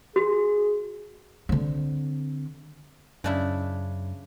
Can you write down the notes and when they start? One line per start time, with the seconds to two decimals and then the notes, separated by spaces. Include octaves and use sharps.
0.16 F#4 G#4
1.49 D3 C4
3.24 F#2 C#3 D4 E4